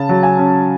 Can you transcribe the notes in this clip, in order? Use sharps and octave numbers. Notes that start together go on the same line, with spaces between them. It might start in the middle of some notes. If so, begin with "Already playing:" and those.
Already playing: C#3 A5
F#3
G#5
C#4